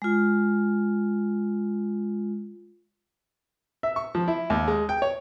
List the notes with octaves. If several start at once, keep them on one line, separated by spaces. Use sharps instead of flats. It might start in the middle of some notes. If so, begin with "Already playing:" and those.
G#3 F4
E5
C#6
F3
E4
D#2
G#3
G5
C#5